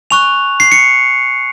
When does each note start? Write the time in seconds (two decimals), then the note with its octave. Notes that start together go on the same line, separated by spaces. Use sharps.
0.11 G#5 C#6 F#6 F7
0.60 C7
0.72 C#7